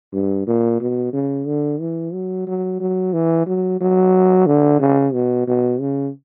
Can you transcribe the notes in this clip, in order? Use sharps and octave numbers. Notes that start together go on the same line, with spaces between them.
G2
A#2
B2
C#3
D3
E3
F#3
F#3
F#3
E3
F#3
F#3
D3
C#3
B2
B2
C#3